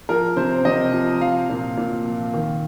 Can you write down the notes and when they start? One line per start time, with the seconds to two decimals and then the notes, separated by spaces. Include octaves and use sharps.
0.09 F3 A#4
0.36 C3 C5
0.65 C3 D#5
0.93 F3
1.21 F3 F5
1.49 A#2
1.77 A#2
2.05 F3
2.34 D#3